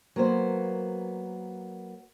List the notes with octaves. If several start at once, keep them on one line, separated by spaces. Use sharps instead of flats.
F#3 A#3 B3 C5